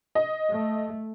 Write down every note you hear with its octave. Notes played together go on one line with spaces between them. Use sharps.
D#5
A3